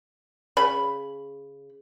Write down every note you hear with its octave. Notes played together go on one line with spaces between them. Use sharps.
C#3 B5